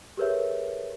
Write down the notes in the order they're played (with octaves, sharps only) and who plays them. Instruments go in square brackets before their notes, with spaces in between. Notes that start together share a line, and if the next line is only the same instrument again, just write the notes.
[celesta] G4 G#4 A#4 B4 C#5 E5